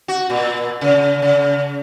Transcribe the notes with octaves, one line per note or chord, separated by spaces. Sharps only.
F#4
A#2
C#3
C#3